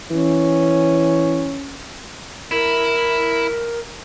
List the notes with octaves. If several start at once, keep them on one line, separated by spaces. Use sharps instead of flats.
E3 C#4
E4 A#4